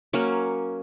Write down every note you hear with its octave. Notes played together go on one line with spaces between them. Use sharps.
F#3 A#3 C#4 C#6